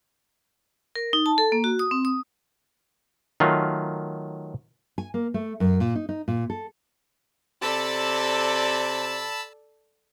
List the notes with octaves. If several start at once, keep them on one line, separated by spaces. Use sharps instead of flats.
A#4
D#4
A5
A4
A#3
F#4
D#6
C4
D#6
D#3 F#3 A3 F4
G#5
A#3
A3
F#2
A#2
D#4
D#4
A#2
A4
C3 A4 D5 A5 B5 E6